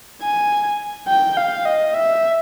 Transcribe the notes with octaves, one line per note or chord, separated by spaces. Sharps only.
G#5
G5
F5
D#5
E5